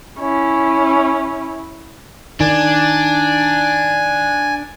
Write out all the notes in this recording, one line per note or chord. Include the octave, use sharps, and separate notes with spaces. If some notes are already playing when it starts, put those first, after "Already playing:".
C#4 E4
D#3 D4 G#5